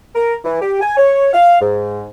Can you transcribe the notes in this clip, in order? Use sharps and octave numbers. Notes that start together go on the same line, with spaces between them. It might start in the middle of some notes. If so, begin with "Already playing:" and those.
A#4
E3
G4
G#5
C#5
F5
G#2